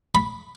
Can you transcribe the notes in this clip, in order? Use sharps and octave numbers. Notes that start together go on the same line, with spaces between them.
B5